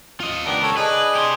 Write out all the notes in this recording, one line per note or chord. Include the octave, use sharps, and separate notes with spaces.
F4 D#5
C#2 B3 D4 G4 A#4
A4 C#5
D4 G#4 B4 D#5
G4 C5